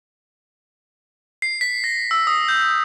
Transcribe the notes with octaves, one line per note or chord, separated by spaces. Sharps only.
C7
B6
A#6
E6
D#6
G6